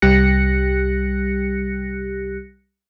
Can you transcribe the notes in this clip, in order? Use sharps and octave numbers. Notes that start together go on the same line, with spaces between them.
C2 G3 G4 F#6 A#6 C#7